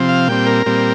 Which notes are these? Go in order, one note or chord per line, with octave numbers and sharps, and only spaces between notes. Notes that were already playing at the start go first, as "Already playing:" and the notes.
Already playing: C3 F3 C4
F5
A#2 G3 C4 G5
A#4
A#2 G3 C4